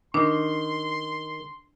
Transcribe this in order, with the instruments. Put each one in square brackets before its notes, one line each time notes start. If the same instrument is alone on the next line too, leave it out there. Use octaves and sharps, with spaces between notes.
[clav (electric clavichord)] D#3 [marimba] D4 [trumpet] C6